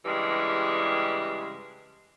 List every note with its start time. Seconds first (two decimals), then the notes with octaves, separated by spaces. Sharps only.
0.04 G2 C#3 E3 G3 G#3